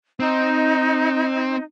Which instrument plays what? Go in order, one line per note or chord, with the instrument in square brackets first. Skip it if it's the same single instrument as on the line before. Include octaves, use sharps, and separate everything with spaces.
[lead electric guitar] C4 [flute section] D#4